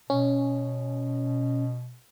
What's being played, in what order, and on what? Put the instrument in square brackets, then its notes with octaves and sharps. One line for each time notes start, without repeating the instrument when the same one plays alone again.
[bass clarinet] B2 [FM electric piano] C#4